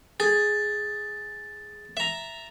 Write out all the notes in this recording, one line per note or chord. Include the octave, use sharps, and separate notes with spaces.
G#4 A6
E5 A#5